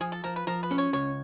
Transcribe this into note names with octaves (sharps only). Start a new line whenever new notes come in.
F3 G#4
A4
F3 A#4
B4
F3 A#4
B4
C#4
C#5
C#2 C#5